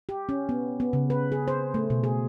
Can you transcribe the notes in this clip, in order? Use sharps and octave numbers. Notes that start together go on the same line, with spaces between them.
G4
C#4
B3
B3
C#3
B4
G#4
C5
A3
B2
G#4